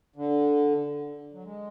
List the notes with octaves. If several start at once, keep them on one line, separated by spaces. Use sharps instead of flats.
D3
F#3
G#3